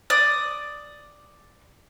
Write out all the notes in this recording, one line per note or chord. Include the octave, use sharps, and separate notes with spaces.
D5 D6 D#6